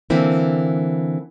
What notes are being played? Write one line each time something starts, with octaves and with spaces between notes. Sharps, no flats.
D3 E3 A#3 C4 E4